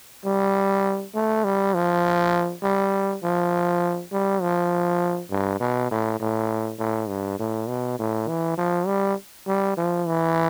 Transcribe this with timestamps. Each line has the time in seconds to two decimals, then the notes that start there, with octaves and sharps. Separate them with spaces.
0.25 G3
1.15 A3
1.45 G3
1.74 F3
2.63 G3
3.23 F3
4.12 G3
4.42 F3
5.31 G2
5.60 B2
5.91 A2
6.20 A2
6.79 A2
7.09 G2
7.39 A2
7.68 B2
7.99 A2
8.28 E3
8.58 F3
8.87 G3
9.48 G3
9.77 F3
10.07 E3